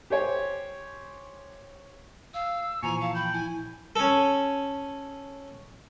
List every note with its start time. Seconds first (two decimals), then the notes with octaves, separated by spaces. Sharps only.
0.10 G4 C5 C#5 G#5
2.34 F5 E6
2.83 A#2 E3 F3 G#5 A#5 C#6
3.01 F5 A5
3.15 G5 B5
3.33 E4 G#5
3.96 C#4 A4